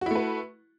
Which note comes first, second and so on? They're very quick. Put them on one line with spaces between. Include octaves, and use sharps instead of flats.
F#4 E4 A3 B4